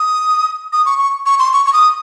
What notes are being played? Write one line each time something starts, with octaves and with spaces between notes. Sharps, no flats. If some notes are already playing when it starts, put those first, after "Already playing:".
Already playing: D#6
D#6
C#6
C#6
C#6
C6
C#6
C#6
D#6